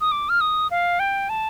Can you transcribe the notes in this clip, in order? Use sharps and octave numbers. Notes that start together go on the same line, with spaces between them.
D#6
D6
F6
D#6
F5
G5
A5